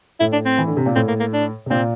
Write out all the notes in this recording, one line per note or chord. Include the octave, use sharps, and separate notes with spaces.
A2 E4
D4
C4
E3
D3
C3
A#2
A2 C4
A#3
A#3
D4
C3
A#2 C4